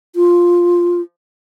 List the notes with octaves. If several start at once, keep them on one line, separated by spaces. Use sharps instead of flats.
F4